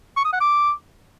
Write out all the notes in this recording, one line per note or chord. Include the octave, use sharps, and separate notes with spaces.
C#6
D#6
F#5
D6